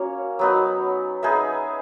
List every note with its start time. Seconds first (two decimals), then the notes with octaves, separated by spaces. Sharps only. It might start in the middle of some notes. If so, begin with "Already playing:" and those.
Already playing: A#3 C#4 F#4 C#5
0.39 F#3 B3 D#4
1.23 D#4 G#4 B4 E5